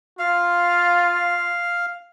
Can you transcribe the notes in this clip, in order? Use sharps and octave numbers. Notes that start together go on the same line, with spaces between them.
F4 F5